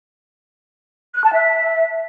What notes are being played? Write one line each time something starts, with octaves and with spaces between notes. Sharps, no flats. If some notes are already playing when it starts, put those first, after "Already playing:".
F#6
A5
E5